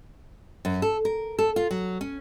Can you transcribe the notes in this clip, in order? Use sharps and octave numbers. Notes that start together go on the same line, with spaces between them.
F#2
A4
A#4
A4
F4
F#3
C#4